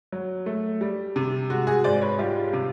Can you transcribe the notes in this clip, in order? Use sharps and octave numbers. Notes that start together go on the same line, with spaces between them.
F#3
A3
G3
C3
G#3 F#4
F#4 G#4
G#2 C5 D5
B4 C#5
G3 F4 G4
C3